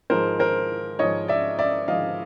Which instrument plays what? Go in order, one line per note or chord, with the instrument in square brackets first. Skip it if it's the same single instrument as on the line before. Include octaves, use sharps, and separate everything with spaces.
[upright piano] G#2 F3 G#3 A#4 C5
A#4 C5
G#2 F3 G#3 C#5 D#5
D5 E5
D5 E5
G#2 F3 G#3 D#5 F5